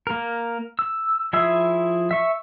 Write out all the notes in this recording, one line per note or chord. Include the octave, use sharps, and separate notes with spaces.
A#3 A#4
E6
F3 E4 G#4 E5 E6
E5 C#6